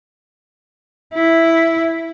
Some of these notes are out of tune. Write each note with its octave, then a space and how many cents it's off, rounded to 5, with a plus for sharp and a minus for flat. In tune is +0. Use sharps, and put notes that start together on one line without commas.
E4 +0